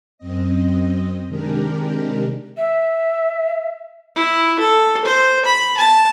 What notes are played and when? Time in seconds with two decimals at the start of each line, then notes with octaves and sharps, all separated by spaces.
0.18 F#2 C4 D#5
1.28 C3 D#3 G#3 D4 G4 A#4
2.57 E5
4.16 E4
4.59 A4
5.05 C5
5.45 B5
5.77 A5